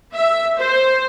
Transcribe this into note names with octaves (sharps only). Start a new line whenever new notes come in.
E5
C5